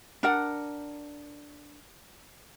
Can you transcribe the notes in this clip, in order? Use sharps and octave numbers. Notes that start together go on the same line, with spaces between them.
D4 A#4 F#5